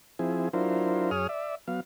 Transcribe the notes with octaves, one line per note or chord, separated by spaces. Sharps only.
F3 C4 E4 G#4
F#3 D4 E4 F4 A#4 C5
F#2 G#4 C#5 D#6 F6
D5 E5
F#3 B3 F5